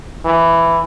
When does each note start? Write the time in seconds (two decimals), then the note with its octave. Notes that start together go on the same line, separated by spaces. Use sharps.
0.25 E3